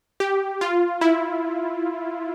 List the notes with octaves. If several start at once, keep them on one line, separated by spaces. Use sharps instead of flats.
G4
F4
E4